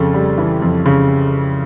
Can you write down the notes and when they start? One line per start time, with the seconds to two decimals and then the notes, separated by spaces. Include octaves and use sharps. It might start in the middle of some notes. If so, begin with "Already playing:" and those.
Already playing: F2 C#3 A4
0.14 G3
0.38 E3
0.62 F2
0.86 C#3